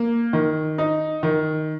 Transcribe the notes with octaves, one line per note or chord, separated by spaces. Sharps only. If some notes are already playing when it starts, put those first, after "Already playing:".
Already playing: A#3
D#3
D#4
D#3